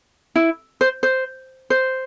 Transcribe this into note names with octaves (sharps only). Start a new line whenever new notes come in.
E4
C5
C5
C5